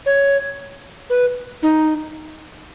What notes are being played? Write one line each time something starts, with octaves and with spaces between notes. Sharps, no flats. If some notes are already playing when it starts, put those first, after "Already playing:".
C#5
B4
D#4